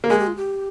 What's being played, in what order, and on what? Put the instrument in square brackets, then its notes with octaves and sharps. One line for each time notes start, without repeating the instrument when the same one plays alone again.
[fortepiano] A#3
[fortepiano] G#3 [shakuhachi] G#4
[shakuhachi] G4
F4
G4